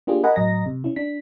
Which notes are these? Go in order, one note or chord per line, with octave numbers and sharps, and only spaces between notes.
A#3 D4 F4 G4 G#4
A#4 D#5 F#5 G#5 A#5 B5
A2 F#3 D#5 A#5 A#6
C3
C#4 E4
D4 B6